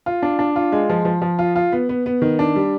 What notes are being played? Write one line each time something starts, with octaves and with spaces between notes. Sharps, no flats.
F4
D4
D4
F4
G#3
F3
F3
F3
F4
F4
B3
B3
B3
D#3
D4
G3